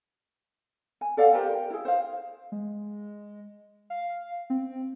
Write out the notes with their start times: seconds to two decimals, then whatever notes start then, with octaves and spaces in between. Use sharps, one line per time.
1.01 G#5
1.17 A4 D5 F5 F#5
1.33 G4 A#4 C5 G5
1.50 G5
1.70 E4 G#4
1.85 C5 F5
2.52 G#3
3.90 F5
4.50 C4